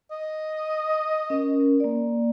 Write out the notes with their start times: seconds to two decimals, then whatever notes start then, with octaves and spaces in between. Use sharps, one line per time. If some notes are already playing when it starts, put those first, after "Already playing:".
0.11 D#5
1.30 C#4 A#4
1.80 A#3 D5